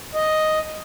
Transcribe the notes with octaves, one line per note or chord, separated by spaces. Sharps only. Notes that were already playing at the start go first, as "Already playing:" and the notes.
D#5